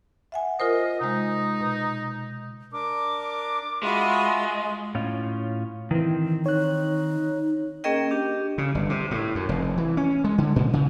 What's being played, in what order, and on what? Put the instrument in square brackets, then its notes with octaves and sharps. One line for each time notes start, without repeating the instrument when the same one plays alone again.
[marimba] E5 F#5 G#5
[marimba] F4 A#4 C5 [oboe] D#5
[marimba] C3 G#3 [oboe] D#4
[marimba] B2
[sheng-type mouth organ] D4 A#4 [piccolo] D6
[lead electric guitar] G#3 [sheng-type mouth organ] F4 E5 [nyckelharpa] F#4 B5 [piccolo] C6
[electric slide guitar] A2 C#4 F4
[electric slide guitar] D#3 C4 [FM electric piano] E3
[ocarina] D#4 [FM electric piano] C#5 F#6
[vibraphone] A#3 C#4 G#4 A#4 D#5 G5
D4 G4
[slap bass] C#3
G1
C3
A2
F#2
F1
E3
C#4
G#3
D3
A#2
C#3